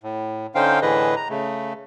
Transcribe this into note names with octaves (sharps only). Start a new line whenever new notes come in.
A2
D3 C#4 D#4 C5 F5 G5
A2 D3 E3 G#4 B4 D#5
A#5
C#3 A3